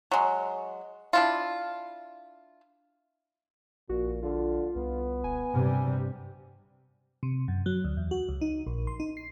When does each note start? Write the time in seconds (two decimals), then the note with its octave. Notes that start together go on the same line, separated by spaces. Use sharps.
0.11 F#3 G#3
1.13 D4 E4 F4
3.89 A#1 A#2 F#4
4.23 D3 F4
4.75 C2 B3
5.24 D#1 G#5
5.53 G2 C3 G3
7.23 C3
7.48 F#2
7.66 F#3
7.84 D2
7.97 E2
8.11 F#4
8.29 C#2
8.41 D#4
8.67 A#1
8.87 C6
9.00 D#4
9.17 C7